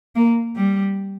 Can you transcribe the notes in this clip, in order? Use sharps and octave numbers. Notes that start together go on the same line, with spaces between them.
A#3
G3